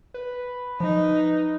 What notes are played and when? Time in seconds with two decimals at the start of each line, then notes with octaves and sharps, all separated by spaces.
0.14 B4
0.80 F3 D#4